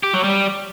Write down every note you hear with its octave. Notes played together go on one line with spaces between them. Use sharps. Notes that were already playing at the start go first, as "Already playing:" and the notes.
G4
F#3
G3